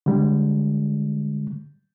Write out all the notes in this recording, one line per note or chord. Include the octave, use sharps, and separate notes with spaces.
D3 G3 G#3